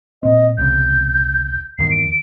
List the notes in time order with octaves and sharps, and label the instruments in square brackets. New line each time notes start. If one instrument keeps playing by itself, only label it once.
[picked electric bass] A#2 C4 [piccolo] D#5
[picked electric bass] E1 C2 C#3 [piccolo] G6
[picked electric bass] E2 G2 D#3 [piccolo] C7
[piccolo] D7